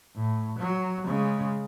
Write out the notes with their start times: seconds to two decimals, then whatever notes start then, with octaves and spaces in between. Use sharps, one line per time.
0.16 A2
0.60 F#3
1.07 C#3 G#3